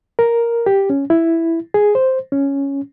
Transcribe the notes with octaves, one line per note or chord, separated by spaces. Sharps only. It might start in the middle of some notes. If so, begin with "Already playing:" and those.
A#4
G4
C#4
E4
G#4
C5
C#4